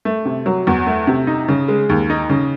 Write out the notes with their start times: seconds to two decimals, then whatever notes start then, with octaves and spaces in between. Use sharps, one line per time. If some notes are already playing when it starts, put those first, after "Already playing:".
0.05 A3
0.25 C3
0.46 F#3
0.67 E2
0.87 A3
1.07 C3
1.27 D#4
1.48 C#3
1.68 G#3
1.89 D#2
2.10 D#4
2.29 C#3